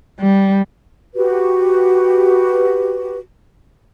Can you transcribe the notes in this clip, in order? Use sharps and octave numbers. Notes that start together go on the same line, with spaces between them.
G3
F#4 G4 B4